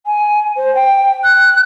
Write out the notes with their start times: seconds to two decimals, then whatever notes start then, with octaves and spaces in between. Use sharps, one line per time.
0.06 G#5
0.56 C5
0.75 G5
1.23 F#6